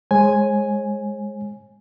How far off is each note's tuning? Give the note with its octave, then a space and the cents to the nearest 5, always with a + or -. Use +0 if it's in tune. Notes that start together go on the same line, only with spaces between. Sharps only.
G#3 +0 C#5 -45 G#5 +0